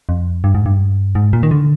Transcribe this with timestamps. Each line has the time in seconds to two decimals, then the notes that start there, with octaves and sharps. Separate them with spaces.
0.09 F2
0.44 G2
0.55 G#2
0.66 G2
1.15 G#2
1.33 A#2
1.43 D#3
1.51 D3